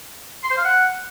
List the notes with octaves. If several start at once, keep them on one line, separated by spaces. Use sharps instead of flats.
C6
C5
F5
F#5